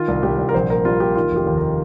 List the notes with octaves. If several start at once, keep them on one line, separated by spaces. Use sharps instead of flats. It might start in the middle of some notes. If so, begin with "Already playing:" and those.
Already playing: D#3 F4
C2
C2 G4
C2
A#4
A#1 C5
A#3 A#4
G3 F4
A#3 G4
D#3 F4
F1
G4
D#2
A#4